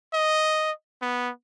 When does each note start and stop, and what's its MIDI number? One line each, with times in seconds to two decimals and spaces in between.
0.14 0.71 75
1.02 1.30 59